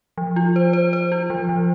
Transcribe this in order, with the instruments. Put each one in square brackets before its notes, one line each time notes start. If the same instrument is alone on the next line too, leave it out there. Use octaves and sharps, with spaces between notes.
[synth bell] F3
F4
C5
C5
C5
F4
F3
F3